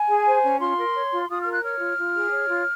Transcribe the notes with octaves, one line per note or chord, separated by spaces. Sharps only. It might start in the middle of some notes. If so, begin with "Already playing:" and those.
Already playing: G#5
G#4
C5
C#4
F4 C6
A#4
C#5
F4
F4 D#6
F6
A#4
F#6
C#5 F6
F4
F4
G#4
C#5
F4